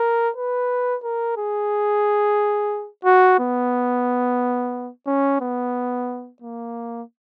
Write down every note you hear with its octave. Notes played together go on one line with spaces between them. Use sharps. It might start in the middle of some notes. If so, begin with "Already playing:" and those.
Already playing: A#4
B4
A#4
G#4
F#4
B3
C#4
B3
A#3